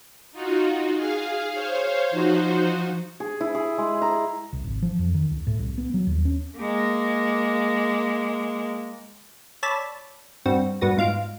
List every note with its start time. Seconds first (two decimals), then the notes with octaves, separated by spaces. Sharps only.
0.32 D#4 F4 F#4
0.96 G#4 F5
1.51 C5 C#5 F5
2.11 F3 D#4 F#4 C5
3.20 G#4
3.41 E4
3.55 G#4
3.78 G#3
4.02 A#5
4.53 C2
4.64 G#1
4.82 F3
4.99 F2
5.14 D#3
5.31 C#2
5.47 A2
5.59 C2
5.78 B3
5.94 F#3
6.07 D#2
6.25 C#4
6.59 G#3 A#3
9.63 C#5 D5 A5 B5 E6
10.46 G2 C4 F#4
10.81 G2 B3 F#4 A#6
10.98 G#2 F4 F6 D7